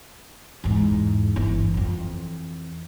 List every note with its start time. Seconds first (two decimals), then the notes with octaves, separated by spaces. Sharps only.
0.64 E2 G#2
1.36 G1 E3
1.74 F2 E3